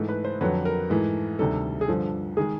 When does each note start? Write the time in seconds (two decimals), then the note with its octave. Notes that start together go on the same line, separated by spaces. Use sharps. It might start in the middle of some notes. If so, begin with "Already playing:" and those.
Already playing: G#2 E3 A3 A4
0.09 B4
0.25 C5
0.41 F2 D3 F#3 B4
0.65 A#4
0.90 G#2 E3 A3
1.39 D2 C3 D#3 G3 A4
1.81 G#4
1.88 G2 D3 F3 A4
2.37 D#3 G#3 G#4